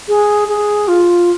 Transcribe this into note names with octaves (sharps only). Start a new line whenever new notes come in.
G#4
G#4
F4